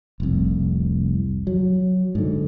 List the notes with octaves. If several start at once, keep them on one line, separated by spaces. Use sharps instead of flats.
F1 C2
F#3
G#2 D3